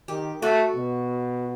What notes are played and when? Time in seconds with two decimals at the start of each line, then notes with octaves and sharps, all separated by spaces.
0.08 D#3 G4
0.42 A3 F#4
0.76 B2